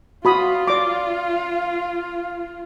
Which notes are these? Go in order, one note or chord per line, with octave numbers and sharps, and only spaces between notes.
F4 F#4 F5 B5 D#6
D5 D6